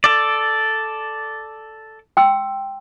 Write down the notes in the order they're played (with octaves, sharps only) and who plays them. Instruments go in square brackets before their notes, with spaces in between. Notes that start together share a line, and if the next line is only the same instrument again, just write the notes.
[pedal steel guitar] A4 D5
[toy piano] G5 C6 E6